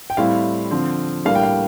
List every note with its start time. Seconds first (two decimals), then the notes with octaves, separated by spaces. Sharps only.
0.10 G5
0.17 A2 G3 C4 E4 F5
0.71 D3 F3 C4
1.25 A2 G3 A#3 D4 F5
1.35 G5
1.43 F5